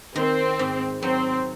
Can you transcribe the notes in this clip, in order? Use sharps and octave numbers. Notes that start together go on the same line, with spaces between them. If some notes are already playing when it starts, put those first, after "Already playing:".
D#3 C4
G#2
F#3 C4